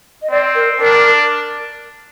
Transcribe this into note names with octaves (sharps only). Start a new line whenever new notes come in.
D#5
C4 D5
A#4
D4 A#4